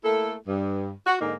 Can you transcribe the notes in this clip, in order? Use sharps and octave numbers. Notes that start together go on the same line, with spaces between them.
A3 A#3 E4 A4
G2
F#4
G#2 D3 A#3 D#4